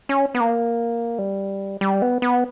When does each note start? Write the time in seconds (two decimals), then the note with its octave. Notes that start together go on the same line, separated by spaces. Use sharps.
0.09 C#4
0.35 B3
0.40 A#3
1.19 G3
1.81 G3
2.02 B3
2.22 B3